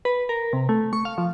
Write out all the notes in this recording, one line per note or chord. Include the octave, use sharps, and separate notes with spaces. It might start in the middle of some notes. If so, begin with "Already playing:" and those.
B4
A#4
C3
A3
C#6
F5
F3